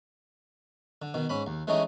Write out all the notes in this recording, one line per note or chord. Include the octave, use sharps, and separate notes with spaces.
D3
B2 D#3
G#2 C#4 B5
D#2
E3 G#3 A3 C#4 D#4 D#5